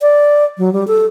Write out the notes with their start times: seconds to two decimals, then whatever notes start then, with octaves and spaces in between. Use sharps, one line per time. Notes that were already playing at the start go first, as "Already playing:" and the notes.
0.02 D5
0.58 F#3
0.73 G3
0.87 A4